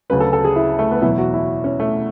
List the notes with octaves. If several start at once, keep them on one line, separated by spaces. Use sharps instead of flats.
D2 C#3 F#3 B4
A4
A4
G#4
E4
A3
B3
E2 B2 F#3 E4
F#4
E4
C#4
A3